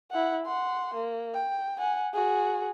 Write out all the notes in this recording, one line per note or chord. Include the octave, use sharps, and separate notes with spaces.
E4 F#5
F#5 C6
A#3
G5
F#5 G#5
F#4 G#4